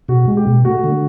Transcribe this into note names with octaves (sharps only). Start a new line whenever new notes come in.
B2 F#4
G#3
G4
B2
A3 F#4
D3